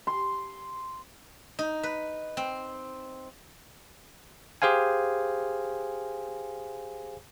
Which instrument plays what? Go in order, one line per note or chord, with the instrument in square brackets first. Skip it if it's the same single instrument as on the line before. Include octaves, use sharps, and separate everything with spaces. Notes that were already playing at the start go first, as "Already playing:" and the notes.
[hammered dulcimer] C6
[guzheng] D#4
B4
C4
[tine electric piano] G4 G#4 C5 F5 G#5